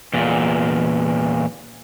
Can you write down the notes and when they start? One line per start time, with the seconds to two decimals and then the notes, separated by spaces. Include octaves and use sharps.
0.13 E2 A#2